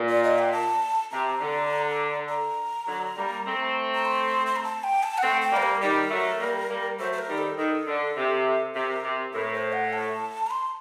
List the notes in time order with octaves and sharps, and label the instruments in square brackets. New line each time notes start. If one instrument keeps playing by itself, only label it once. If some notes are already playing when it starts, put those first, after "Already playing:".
Already playing: [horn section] A#2
[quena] D5
D#5
G5
A5
[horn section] C3 [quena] A#5
[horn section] D3
[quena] A#5
[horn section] D3 F#3
G3 A#3
A3 C4
[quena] A#5
C6
C6
A#5
A5
G5
A5
F#5
[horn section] A3 C4 [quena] G5
[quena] G5
[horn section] G3 A#3 [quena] C5
[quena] A#4
[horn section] D#3 G3 [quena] A#4
[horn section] F#3 A3
G3 A#3
G3 A#3
[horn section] F#3 A3 [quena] C5
[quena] C5
A#4
[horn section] D#3 G3
[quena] A4
[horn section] D#3 [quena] A4
[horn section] D3
C3
[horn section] C3 [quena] A#4
[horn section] C3
[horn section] A2 [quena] A#4
[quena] C5
F#5
A5
A#5
C6